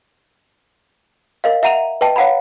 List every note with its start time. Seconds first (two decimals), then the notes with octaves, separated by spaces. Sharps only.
1.44 A#4 D#5 F5
1.63 E5 F#5 A#5 D#7 F7
2.01 B4 D#5 G5 A5
2.16 C#5 F5 F#5 A#5 B5